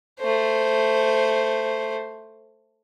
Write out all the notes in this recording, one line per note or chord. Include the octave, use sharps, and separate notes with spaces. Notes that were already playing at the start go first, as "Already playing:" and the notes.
A3 C5